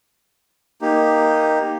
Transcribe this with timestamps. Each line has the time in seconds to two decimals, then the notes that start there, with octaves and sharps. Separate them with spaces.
0.82 A#3 D#4 G4